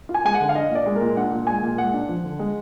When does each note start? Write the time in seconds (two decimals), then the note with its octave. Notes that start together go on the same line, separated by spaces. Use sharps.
0.09 F4
0.14 G#5
0.24 G#3 G#5
0.34 F#5
0.40 D3
0.49 F5
0.55 D4 D#5
0.70 A#2
0.75 D5
0.86 G#3
0.96 A#2 A#4
1.17 D4 F#5
1.32 A#2
1.47 G#3 G#5
1.63 A#2
1.78 G#3 F#5
1.94 D4
2.09 F3
2.24 D3
2.39 G#3